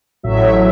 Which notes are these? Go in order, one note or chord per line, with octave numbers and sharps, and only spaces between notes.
A1 A2 F#3 E5